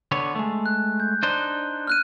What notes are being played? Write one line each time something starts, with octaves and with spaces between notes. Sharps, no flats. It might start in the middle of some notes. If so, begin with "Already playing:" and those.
D3 B3 C#5
G#3 A3
F#6
G6
D4 D#4 C5
F6 F#6 D#7